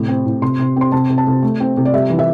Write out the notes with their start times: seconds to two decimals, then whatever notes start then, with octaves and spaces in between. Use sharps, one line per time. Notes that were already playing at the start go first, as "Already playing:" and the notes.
Already playing: A2 C3
0.08 C4
0.26 A2
0.42 C3 C6
0.59 C3
0.76 C4 C6
0.92 C3 A5
1.09 C3
1.18 A5
1.27 C3
1.43 A3
1.60 C4
1.77 C3
1.85 D5
1.94 G3 E5
2.10 E3
2.19 E5